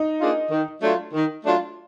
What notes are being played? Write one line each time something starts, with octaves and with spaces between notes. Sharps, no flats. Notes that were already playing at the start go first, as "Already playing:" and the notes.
Already playing: D#4
A#3 D4 F4 G#4
D#3
F#3 A3 D4 F4
D#3
F#3 A3 D4 F4